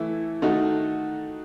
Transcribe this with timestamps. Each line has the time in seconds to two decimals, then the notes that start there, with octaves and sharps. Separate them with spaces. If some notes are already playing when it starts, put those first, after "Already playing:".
Already playing: E3 A3 E4 A4
0.42 D#3 A3 D#4 F#4 A4